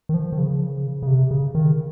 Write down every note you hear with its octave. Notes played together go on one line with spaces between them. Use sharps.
D#3
F3
D#3
C#3
C#3
C3
C#3
D#3